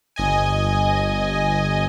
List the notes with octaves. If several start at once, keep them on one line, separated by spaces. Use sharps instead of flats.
G1 D#5 G#5